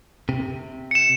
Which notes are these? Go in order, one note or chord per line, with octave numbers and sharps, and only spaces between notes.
C3
C#7 E7